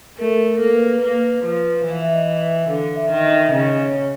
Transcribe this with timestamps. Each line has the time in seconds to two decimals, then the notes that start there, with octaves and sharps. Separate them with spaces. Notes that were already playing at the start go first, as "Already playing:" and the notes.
0.18 A3 A#4
0.46 A#4
0.55 A4
0.60 A#3 A#4
0.74 B4
1.01 A#3 B4
1.44 F3 B4
1.86 E3
1.91 F5
2.01 E5
2.13 D#5
2.41 E5
2.68 D3 F5
2.96 E5
3.10 D#3
3.16 D#5
3.24 E5
3.51 C#3 D#5
3.79 C#5